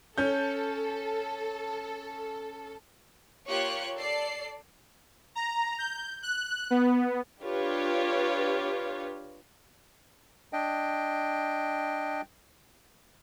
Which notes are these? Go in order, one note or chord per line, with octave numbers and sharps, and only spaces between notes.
C#4 A4 G6
A#3 F4 G4 C#5 C#6 F#6
A4 D5 C7
A#5
G6
F#6
B3
D4 F4 G4 B4 C#5
D4 D#5 G5